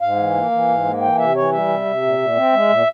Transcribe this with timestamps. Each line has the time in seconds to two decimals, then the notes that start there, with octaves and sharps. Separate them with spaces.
0.01 G#2 F5
0.17 E3
0.35 A#3
0.51 E3
0.68 G#2
0.85 A#3
1.01 E3 G5
1.18 C3 E5
1.35 E3 C#5
1.52 G3 E5
1.68 C3
1.85 C3
2.02 A#2
2.18 A#2
2.35 C4
2.53 G#3
2.69 A#2